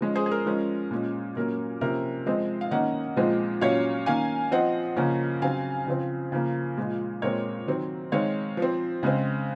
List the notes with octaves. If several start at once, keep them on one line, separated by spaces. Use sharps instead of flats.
F3 G#3 C#4
G#4 C5
G#4
A#4
F3 G#3 C#4
A#2 G#3 C#4
A#2 F#3 A#3 C#4 A#4
C3 F3 A#3 C#4 A#4
F3 G#3 C4 C5 D#5
F5
D#3 A#3 C#4 D#5 F#5
A#2 F3 G#3 C4
A#2 F#3 C#4 C#5 F5
D#3 A#3 C#4 F5 G#5
F3 C4 D#5 F#5
C#3 F3 A#3 C#4
C#3 F#3 C4 F5 G#5
C#3 F3 C4
C#3 F3 A#3
A#2 F3 G#3
A#2 G#3 C4 A#4 C#5
D#3 F#3 C4
D#3 G#3 C4 C#5 F5
F3 C4
C#3 G#3 C4